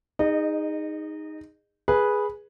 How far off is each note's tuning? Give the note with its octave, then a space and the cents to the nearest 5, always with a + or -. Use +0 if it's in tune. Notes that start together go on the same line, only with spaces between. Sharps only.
D#4 +0 G#4 -25 D#5 -30
G#4 +0 B4 -10